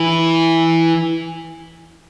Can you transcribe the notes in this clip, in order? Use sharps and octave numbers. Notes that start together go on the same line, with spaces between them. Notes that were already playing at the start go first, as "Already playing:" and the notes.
Already playing: E3